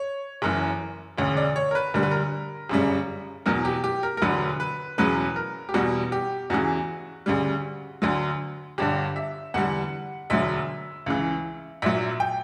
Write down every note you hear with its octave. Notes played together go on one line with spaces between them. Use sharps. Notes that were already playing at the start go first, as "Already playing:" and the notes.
Already playing: C#5
F#1 F#2 E3 A#4
E1 D2 C#3 C#5
D5
C#5
A#4
B4
D2 D3 G3 A#4
B4
A#4
G1 F#2 C#3 G3
E2 B2 F#3 A#4
G4
G4
A#4
A#4
E1 D2 D3 F#3 B4
B4
E1 E2 C#3 F#3 B4
A#4
G4
E2 B2 G3 F#4
G4
E2 C#3 E3 F#4
D2 C#3 G3
D2 D3 F#3
G1 G2 D3 G4
E5
E2 D3 G3 F#5
E1 D2 D3 F#3 E5
C#2 C#3 E3
A#1 A#2 F#3 E5
G5